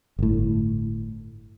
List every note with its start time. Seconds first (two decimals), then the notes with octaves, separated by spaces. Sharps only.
0.19 G1 A2